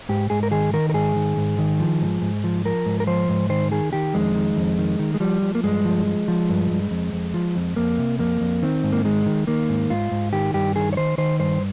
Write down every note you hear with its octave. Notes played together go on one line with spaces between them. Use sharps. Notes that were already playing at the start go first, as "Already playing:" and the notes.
G#2 G4
G#2 G#4
A#4
D#3 G#4
D#3 A#4
A#4
G#2 G#4
D#3
G#2
D#3
F3
G#2
G#2
F3
F3 A#4
G#2
A#4
F3 C5
G#2
D#3 C5
D#3 G#4
D#3 G4
F2 G#3
D#3
F2
D#3
D#3
G#3
F3 G3
F3
A#3
G2 G#3
F3
F3
F3
G2
G2
F2
F2
F3
F2
F2 A#3
C3
F2 A#3
F2
D#3 C4
G#2
A#3
D#3 G#3
D#3
D#3 A#3
G#2
G#2 F4
G#2
D#3 G4
G2 G4
D#3 G#4
C#5
D#3 C5
D#3 C5
G2 C5